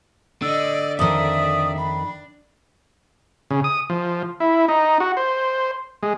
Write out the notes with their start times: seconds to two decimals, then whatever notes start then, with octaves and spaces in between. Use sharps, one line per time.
0.42 D3 D5 D#5 E6
0.99 F2 D#3 D5 E5 D#6
1.77 D4 B5
3.50 C#3
3.64 D#6
3.90 F3
4.40 E4
4.68 D#4
5.00 F#4
5.17 C5
6.03 G#3